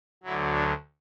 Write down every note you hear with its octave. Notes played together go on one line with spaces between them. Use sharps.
D2 D3 F#3 E4
D4